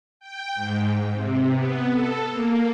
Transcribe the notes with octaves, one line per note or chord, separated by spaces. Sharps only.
G5
G#2
C3
B3
A4
A#3